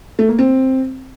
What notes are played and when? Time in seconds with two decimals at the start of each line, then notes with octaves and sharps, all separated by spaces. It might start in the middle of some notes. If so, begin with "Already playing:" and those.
0.19 A3
0.29 A#3
0.39 C4